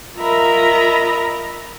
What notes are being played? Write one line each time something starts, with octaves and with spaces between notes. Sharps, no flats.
F4 A#4 D#5 E5 A#5 B5